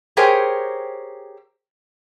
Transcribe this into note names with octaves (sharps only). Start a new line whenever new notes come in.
G4 G#4 A#4 C5 C#5 G5